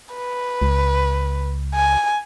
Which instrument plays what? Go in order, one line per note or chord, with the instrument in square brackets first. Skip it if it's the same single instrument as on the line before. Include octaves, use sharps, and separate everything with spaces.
[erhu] B4
[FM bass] C#2
[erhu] G#5